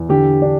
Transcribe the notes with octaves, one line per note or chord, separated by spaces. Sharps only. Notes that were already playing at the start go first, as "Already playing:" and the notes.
Already playing: E2
D3 G4
D4